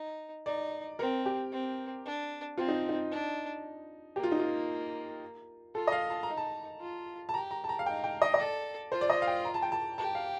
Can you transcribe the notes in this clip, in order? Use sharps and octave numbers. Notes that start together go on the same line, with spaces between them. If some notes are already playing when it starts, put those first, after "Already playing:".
Already playing: D#4
D#4 D5
C4 A#4
G4
C4
D4
C4 F4
D#4
D#4
D4
A#3 G4
F4
D#4
F4
F4 A4
D#5
F5
A5
D#4 A#5
A5
F4
A5
G4 A#5
A#5
A5
A#5
F5
D#4 G5
G5
D#5
D#5
A4 D5
F4 C5
D5
D#5
F5
G5
A#5
A5
G5
A5
G4 A5
F5